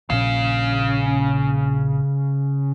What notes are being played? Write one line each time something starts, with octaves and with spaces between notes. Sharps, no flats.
A#1 A#2 C#3 C#4 F5